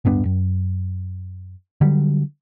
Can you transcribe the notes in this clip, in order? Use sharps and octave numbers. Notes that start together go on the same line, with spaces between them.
D1 G2 B3 D4
F#2
D3 F#3 G3